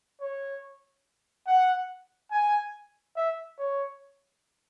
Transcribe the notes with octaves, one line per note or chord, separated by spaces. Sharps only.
C#5
F#5
G#5
E5
C#5